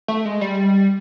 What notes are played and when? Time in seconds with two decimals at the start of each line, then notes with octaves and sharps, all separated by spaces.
0.08 A3
0.25 G#3
0.41 G3